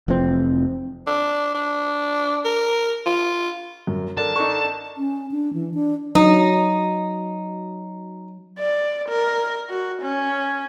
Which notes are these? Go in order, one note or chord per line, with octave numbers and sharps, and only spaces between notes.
F1 F2 E3 C4
D4
D4
A#4
F4
F#2
D3 A#4 A5
D3 D#4 C#6
C#4
D4
E3
D4
F#3 D#4
D5
A#4
F#4
C#4